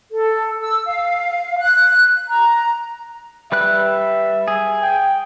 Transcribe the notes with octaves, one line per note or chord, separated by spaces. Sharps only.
A4
E6
F5
F#6
A#5
G3 B4 E5 F#6
G#4
G5